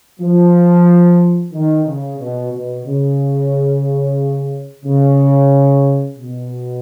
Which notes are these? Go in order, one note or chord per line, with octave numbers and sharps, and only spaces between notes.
F3
D#3
C#3
B2
B2
C#3
C#3
B2